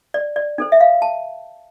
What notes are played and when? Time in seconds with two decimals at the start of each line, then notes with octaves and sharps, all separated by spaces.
0.14 D5
0.36 D5
0.58 D4 A4 C5
0.72 E5
0.81 F5
1.02 A5